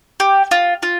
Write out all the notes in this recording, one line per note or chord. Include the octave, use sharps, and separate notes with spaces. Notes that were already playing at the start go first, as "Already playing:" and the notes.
G4
F4
F4